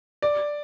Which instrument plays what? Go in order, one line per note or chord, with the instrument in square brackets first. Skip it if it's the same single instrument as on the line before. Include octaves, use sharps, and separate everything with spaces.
[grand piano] D5